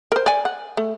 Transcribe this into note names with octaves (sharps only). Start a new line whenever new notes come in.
A#4 C5
D5 G#5
F#5
A3